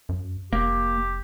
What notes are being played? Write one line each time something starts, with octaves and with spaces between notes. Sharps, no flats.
F#2
F1 A#3 G4